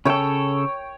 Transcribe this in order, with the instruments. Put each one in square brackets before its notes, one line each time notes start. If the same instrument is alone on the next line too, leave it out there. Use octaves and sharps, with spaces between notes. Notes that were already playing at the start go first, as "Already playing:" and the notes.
[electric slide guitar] C#3 A4 [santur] C#5 G5